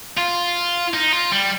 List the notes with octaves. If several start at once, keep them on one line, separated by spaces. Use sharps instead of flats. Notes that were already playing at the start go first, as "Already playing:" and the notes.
F4
D#4
F4
G3